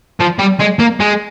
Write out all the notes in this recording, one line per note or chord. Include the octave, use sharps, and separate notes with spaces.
F3
G3
G#3
A#3
G#3